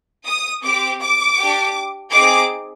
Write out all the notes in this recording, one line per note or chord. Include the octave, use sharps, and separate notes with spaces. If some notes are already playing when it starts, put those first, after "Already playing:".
D#6
C4 G4 D6
D6
D4 G4
C4 D#4 G#4 D6